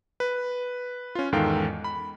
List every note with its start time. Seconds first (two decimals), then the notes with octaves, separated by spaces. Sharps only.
0.20 B4
1.15 C#4 F4
1.32 E2 G#2 D#3 A4 F5 G5
1.84 B5